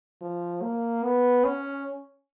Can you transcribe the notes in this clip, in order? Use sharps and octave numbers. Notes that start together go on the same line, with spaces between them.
F3
A#3
B3
C#4